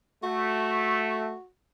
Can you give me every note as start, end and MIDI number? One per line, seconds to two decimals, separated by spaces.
0.23 1.34 57
0.23 1.47 66